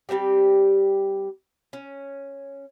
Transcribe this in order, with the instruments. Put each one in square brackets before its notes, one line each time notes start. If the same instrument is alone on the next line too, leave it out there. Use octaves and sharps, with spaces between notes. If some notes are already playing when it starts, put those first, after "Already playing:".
[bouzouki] G3 A#3 C4 G4
C#4